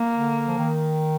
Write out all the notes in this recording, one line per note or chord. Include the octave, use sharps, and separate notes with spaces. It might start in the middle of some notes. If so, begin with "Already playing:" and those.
Already playing: A#3
D3
F3
D#3